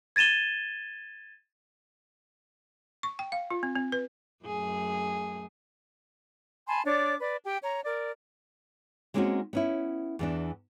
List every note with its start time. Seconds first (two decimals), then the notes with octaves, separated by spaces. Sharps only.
0.16 G#6 A6 D#7 E7 G7
3.03 C#6
3.19 G5
3.32 F5
3.50 F4
3.63 C4
3.76 C4
3.92 B4
4.45 F#2 A3 G#4
6.67 G#5 A5 B5 C6
6.85 D4 C#5 D5 D6
7.20 B4 D5
7.46 G4 G5
7.62 C#5 A#5
7.84 A#4 D5
9.14 G#3 A#3 C4 C#4 D#4 F#4
9.53 B3 C#4 E4
10.19 E2 E3 D4